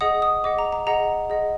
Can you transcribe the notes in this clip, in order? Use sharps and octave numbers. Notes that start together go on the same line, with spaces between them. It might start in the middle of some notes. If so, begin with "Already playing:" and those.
G#4 D#5 F#5 D#6
D#6
G#4 D#5 F#5 D6
A#5
A#5
G#4 D#5 F#5 A#5
G#4 D#5 F#5